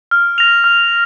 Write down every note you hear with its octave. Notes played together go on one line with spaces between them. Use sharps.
F6
A#6 F7
F6